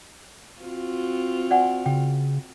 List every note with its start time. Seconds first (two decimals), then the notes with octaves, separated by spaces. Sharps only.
0.61 C4 F4 F#4
1.51 D5 F#5 G#5
1.86 C#3 G5